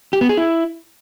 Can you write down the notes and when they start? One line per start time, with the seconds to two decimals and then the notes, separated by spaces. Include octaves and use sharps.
0.13 G4
0.21 B3
0.29 G#4
0.37 E4